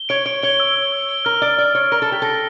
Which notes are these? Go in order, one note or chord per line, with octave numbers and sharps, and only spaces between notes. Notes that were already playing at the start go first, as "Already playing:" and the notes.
Already playing: G7
C#5 D7
C#5 D7
C#5 G7
E6
E6
E6
G7
A#4 F6
D5 D7
D5 F6
C#5 F6
A#4 D7
A4
G4 D7
A4 A#6